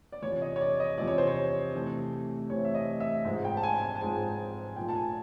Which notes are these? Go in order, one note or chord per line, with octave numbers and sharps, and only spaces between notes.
D5
E2 C3 F3 C#5
D#5
C#5
D5
D#5
E2 C3 F3 D5
C#5
C5
C#5
C3 E3 A3 C4
C3 E3 A3 C4 C#5
E5
D#5
E5
G#2 F3 G#3 C4
G5
A5
G#5
G#5
A5
G#2 F3 G#3 C4 G#5
A#2 F3 A3 G5
A5
G#5